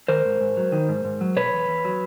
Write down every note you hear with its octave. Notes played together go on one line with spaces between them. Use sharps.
D#3 A#4 C5
G#2
G#2
F#3
D#3
G#2
G#2
F#3
B2 B4 C#5
E2
E2
F#3